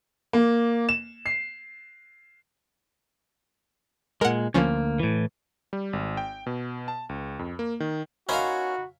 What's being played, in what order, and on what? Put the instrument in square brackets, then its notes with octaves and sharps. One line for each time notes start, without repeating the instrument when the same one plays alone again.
[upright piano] A#3
E7
C7
[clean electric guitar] A#2 G#3 [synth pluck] A#4 F#5
[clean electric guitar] D2 A#3 [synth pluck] F3 C#4
[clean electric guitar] A2 E3
[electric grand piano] G3
G#1
G5
B2
A5
C#2
F2
A#3
D#3
[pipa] C#4 [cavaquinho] D#4 B4 C6 [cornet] F#4 [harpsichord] A#4 E5 F5